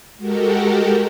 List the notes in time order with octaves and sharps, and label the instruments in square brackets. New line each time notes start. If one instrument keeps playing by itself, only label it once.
[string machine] G#3 F#4 G4 A4 A#4